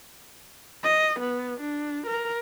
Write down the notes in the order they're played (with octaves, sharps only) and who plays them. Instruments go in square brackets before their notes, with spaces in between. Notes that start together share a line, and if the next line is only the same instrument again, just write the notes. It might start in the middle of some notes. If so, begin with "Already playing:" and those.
[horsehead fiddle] D#5
B3
D4
A#4